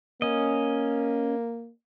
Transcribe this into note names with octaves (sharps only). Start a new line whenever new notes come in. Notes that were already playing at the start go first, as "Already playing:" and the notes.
A#3 C#4 D#5